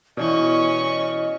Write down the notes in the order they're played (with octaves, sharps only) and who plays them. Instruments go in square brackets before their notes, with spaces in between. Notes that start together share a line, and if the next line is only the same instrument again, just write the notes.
[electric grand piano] B2 E3 [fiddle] C#4 C#6 [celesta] E4 D5 [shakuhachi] D#5